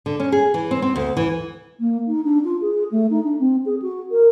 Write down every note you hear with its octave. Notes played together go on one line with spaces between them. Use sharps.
D3
C#4
G#4
E3
C4
C4
D2
E3
A#3
D#4
D4
F4
G#4
A3
D#4
D4
C4
G#4
F#4
A#4